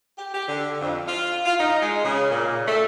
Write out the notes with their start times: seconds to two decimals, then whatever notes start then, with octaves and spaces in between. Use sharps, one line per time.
0.17 G4
0.34 G4
0.48 D3
0.81 F2
1.08 F4
1.46 F4
1.60 D#4
1.81 G#3
2.04 C#3
2.31 A#2
2.67 A3